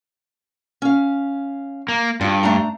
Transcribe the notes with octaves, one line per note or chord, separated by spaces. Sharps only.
C#4 F5
A#3
G2 F4
A3 D4 A#5